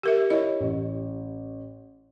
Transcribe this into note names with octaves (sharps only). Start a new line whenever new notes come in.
G4 A#4 E5
E4 C#5 D#5
A1